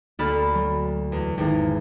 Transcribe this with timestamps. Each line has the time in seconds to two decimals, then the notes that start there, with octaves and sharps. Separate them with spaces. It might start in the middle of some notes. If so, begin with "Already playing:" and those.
0.19 D2 A#3 A4 B5 F6
0.55 F#3
1.12 E2
1.38 G#1 E2